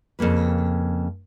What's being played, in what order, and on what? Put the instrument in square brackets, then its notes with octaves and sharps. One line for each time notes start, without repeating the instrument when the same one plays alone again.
[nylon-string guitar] F2 C#3 A#3 B4